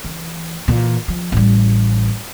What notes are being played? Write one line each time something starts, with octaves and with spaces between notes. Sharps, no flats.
E3
A#2 E3
F3
A1 G3